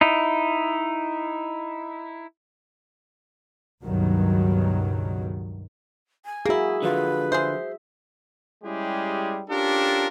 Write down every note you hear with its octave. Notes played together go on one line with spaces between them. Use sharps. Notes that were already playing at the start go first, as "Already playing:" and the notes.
D#4 E4
C#2 G2 B2 D#3 F#3
G#5
A#3 E4 F#4 G#4
D3 F3 F4 B4
G#4 C5 E5
G3 G#3 C#4 E4 G4 G#4
C#4 D4 F4 G4 A4 A#4